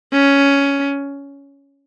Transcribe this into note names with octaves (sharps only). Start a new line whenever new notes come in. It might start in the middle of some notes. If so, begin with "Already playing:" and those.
C#4